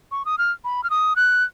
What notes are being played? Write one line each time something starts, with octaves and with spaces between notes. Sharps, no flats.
C#6
D#6
F6
B5
F6
D#6
F#6